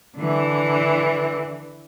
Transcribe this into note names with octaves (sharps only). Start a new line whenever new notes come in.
D3 E3